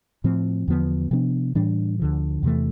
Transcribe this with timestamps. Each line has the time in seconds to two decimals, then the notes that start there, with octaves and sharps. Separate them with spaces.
0.24 A2 F3 C4
0.68 E2 D3 F3 B3
1.11 C3 F3 B3 D4
1.55 A2 E3 G3 D4
1.99 D2 D3 F3
2.43 E2 C3 E3 A3